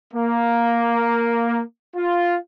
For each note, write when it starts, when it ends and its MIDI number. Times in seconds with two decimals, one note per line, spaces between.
0.14 1.61 58
1.96 2.35 65